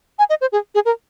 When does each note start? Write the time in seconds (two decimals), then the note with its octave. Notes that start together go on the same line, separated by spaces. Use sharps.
0.19 G#5
0.30 D#5
0.41 C5
0.52 G#4
0.75 G#4
0.85 A#4